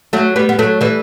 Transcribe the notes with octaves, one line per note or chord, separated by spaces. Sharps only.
F#3 A3
G3 B3
B3
F#3 A3
E3 G3